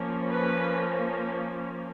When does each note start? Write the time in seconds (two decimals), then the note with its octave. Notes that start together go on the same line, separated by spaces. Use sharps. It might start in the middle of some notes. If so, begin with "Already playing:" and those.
Already playing: F3 A#3 C#4
0.30 B4